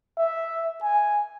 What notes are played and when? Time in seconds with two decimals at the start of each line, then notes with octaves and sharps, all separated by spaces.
0.18 E5
0.83 G#5